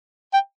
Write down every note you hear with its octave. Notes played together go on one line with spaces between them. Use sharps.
G5